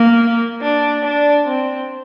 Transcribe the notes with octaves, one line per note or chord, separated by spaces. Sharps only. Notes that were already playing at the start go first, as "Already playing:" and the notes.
Already playing: A#3
D4
D4
C4